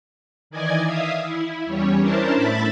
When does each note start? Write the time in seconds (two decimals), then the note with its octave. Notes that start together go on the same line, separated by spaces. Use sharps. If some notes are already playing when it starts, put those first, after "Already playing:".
0.50 D#3 E3 D5 D#5 G#5 G#6
0.85 E5 F5 D#6
1.24 E4
1.66 E2 G3 C#4 C#5
1.99 C#4 D4 E4 A#4 C5 A5
2.35 A2 E5 B5 A6 B6